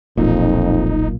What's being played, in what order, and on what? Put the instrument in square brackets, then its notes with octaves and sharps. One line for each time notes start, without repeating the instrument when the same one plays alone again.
[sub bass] E1 [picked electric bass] B1 A#2 [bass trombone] F2 [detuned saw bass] D#4